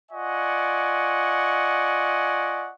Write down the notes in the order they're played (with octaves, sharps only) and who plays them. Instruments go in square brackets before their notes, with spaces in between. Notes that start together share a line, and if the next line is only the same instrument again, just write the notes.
[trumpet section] F4 D5 D#5 F#5 G#5 C#6